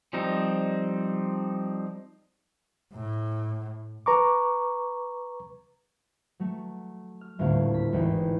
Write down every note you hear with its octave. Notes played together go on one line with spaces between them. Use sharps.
F3 G3 C4 D#4
A2
B4 A#5 C#6 D6
F#3 A3
F6
D#1 D2 A2 A#3 F5
B6
G#1 E2 D#4 D5 G5